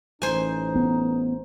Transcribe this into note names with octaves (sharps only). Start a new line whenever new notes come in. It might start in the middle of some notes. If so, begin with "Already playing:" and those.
A1 D#4 C5 G#5
B3